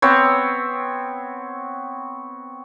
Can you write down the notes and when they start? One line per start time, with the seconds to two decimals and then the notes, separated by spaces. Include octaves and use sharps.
0.02 B3 C4 C#5